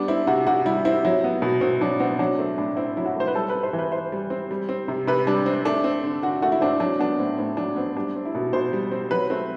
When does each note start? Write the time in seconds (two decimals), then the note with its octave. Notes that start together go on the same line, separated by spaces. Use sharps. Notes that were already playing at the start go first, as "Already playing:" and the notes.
Already playing: G3 B3 D4
0.08 C4 E4
0.27 C3 F#4
0.47 C3 F#4
0.66 G3 E4
0.85 C4 E4
1.05 F#3 E4
1.24 B3
1.42 B2
1.61 B2 C4
1.81 F#3 D4
2.00 B3 C4
2.19 F#3 D4
2.39 A3 C4
2.58 A2 D4
2.77 C4 E4
2.97 F#3 E4
3.06 F#4
3.16 A3 C5
3.27 B4
3.35 G3 A4
3.50 B4
3.55 C4
3.63 C5
3.73 E3
3.79 B4
3.92 E3 C5
4.12 G3
4.30 C4
4.51 G3
4.69 C4
4.88 C3
5.07 C3 B4
5.27 G3 D4
5.46 C4
5.65 A3 D4
5.84 C4
6.04 D3
6.23 D3 F#4
6.42 A3 F#4
6.52 E4
6.61 C4 D4
6.80 F#3 D4
6.99 B3 D4
7.19 A2 C4
7.38 A2 C4
7.57 F#3 D4
7.76 B3 C4
7.96 G3 D4
8.16 C4
8.25 E4
8.35 B2
8.53 B2 C5
8.73 G3
8.91 C4
9.11 F#3 B4
9.30 A3 C4